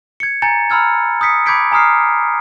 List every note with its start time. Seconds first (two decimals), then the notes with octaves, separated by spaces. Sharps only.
0.20 G#6 C#7
0.42 G#5 A#5 G6 A6 C#7
0.70 A#5 B5 E6 F6 G#6
1.21 D#6 G6 B6 C#7
1.46 B5 D6 G6 G#6 B6 D7
1.72 G#5 A#5 D#6 F6 C7